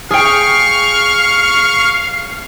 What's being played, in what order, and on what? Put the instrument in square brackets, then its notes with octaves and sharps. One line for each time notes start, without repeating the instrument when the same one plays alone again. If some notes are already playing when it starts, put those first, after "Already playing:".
[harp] G#4 G5 [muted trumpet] F5 [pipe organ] C#6 F6